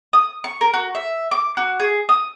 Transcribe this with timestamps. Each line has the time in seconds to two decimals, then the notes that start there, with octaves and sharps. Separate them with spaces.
0.13 D#6
0.44 C#6
0.61 A#4
0.74 F#4
0.95 E5
1.31 D6
1.57 F#4
1.80 G#4
2.09 D#6